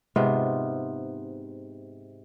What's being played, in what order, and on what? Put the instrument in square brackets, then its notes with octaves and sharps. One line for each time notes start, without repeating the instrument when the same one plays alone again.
[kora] G#2 C3 B3 F4